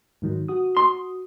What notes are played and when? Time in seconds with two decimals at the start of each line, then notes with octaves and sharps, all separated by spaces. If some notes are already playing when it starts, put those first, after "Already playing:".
0.22 G#2 D#3 F#3
0.48 F#4 D#6
0.77 C6